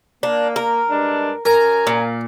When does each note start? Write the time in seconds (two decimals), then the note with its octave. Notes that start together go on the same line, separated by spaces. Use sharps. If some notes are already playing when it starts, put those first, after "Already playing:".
0.23 A#3 D4
0.56 A#4
0.89 G2 G#3 D4
1.45 F#2 A#4 G#5 A#5
1.87 A#2